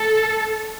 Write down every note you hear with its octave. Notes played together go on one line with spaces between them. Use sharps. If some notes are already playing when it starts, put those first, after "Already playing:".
Already playing: A4